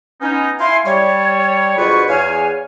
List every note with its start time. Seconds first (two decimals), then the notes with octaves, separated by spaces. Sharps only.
0.22 B3 C#4 D#4
0.60 E4 F5 G#5 C6
0.86 G3 C#5
1.78 D2 B2 F4 G#4 B4 C#6
2.08 E2 C#5 F5 G#5